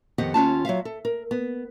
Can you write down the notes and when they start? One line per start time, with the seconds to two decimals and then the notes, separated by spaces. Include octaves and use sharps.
0.18 F2 D#3 B3 G4 D#5 F#5
0.34 D#2 C#4 F4 A5
0.65 F#3 F4 E5 F5
0.85 A4
1.05 A#4
1.31 B3